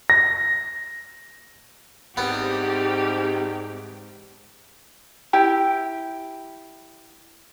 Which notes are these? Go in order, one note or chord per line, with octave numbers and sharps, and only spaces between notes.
A#6
G#2 G3 B3 C4 G4
E4 G4